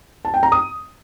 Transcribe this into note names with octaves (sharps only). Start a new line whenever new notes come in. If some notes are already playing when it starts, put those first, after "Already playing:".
A5
G5
A#5
D#6